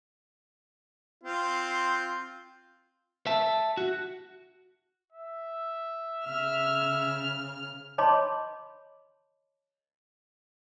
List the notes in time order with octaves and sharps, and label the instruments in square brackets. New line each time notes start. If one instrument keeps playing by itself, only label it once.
[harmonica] C4 F4
[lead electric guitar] E5 A5
F#4
[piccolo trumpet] E5
[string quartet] C#3 F6 [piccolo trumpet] E5
[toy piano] C#5 D#5 A5 B5 C6 D6